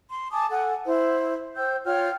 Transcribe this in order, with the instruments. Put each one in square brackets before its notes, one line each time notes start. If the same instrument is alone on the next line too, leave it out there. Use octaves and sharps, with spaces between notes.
[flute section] C6
G#5 A5 D6 D#6
A4 F#5 G#5
E4 C5
C5 G5 E6 G6
F4 C#5 G5 F6